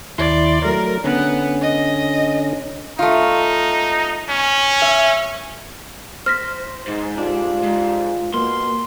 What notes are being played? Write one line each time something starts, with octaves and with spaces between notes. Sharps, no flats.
D#2 E4 D5 C6
F#3 A3 A#4
D3 B3 C#4
D#5
A3 D#4 F4
C#4
E5
C5 F6 A#6 B6
G#2 D#4
D4 F4 G4
G#2
B2 A#3 C6